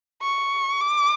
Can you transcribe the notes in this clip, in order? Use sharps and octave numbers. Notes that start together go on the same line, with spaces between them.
C#6
D6